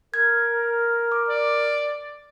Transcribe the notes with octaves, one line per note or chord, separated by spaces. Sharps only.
A#4 G#6
D6
D5